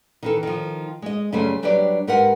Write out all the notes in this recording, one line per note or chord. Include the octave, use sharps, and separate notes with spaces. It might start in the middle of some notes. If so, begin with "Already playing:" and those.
D#3 E3 A4
D#3 F3
G#3 D#5
F#2 C#3 G3 A3 C5 G#5
F#3 G3 D4 G4 B4 D5
G#2 G4 A#4 B4 F#5 G#5